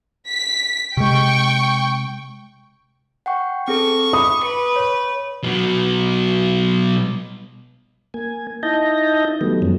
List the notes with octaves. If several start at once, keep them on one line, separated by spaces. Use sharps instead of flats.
B6
C3 G#3 G5 C#6
F#5 G5 C#6
C4 G#4 A4 C#6
B5 D6 D#6
B4
C#5
B2 F#3
A#3 G#5
D#4 E4 D#5 A5 G6 A#6
D#3 F#3 G3 A3 B3
F#2 F3 F#3 G#3 B3 C#4